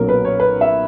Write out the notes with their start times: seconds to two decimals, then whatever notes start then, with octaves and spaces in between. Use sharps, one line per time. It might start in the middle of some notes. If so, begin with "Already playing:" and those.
Already playing: B1 A#2 F#3 C#4 A#4
0.09 B4
0.25 C#5
0.40 B4
0.61 E5